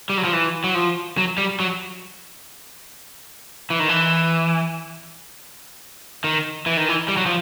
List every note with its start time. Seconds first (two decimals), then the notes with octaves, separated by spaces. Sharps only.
0.10 G3
0.18 F#3
0.24 F3
0.33 E3
0.64 F#3
0.75 F3
1.17 F#3
1.38 G3
1.60 F#3
3.70 E3
3.80 D#3
3.89 E3
6.24 D#3
6.66 E3
6.77 D#3
6.89 E3
7.08 G3
7.17 F#3
7.26 F3